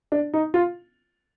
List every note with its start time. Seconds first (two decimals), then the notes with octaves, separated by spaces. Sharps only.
0.12 D4
0.34 D#4
0.54 F4